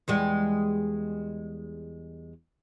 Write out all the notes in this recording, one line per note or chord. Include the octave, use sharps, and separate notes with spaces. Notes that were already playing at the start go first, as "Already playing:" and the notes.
E2 G3 G#3